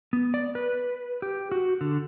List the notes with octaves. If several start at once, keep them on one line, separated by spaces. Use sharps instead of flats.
B3
D5
B4
G4
F#4
D3